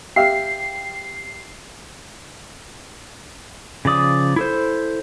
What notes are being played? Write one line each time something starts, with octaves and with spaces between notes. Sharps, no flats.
G4 E5 F5 C7
C#3 F3 D5 D#6
E4 A4 C5